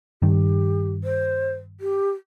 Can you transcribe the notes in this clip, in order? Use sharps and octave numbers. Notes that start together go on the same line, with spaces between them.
G2 D#3 G4
C5
G4